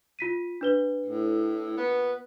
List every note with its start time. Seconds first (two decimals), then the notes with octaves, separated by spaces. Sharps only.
0.19 F4 B6 D#7
0.61 D4 B4 G7
1.07 A2
1.77 A#2 B3